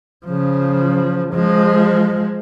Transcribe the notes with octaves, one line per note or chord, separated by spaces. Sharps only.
C#3 F3
F3 G#3